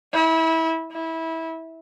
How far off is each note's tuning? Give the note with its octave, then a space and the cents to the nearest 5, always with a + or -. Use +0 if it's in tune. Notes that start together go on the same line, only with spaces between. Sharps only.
E4 -25
E4 -20